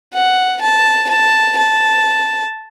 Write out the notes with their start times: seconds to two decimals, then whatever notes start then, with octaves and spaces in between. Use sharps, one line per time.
0.14 F#5
0.62 A5
1.09 A5
1.57 A5